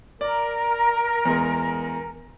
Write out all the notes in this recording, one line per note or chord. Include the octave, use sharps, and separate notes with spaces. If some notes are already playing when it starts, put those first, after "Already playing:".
A#4 D5
E2 G#3